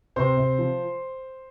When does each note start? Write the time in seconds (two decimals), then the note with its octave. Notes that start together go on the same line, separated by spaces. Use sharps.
0.16 C3 C5 C6
0.37 C3
0.58 F3